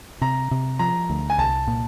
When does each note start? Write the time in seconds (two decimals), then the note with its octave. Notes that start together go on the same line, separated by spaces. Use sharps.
0.21 C3 A#5
0.51 C3
0.79 F3 A#5
1.10 D2
1.30 G#5
1.38 C2 A5
1.68 A#2